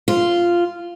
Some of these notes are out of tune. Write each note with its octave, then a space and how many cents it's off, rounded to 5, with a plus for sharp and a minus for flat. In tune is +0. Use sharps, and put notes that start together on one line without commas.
F4 -10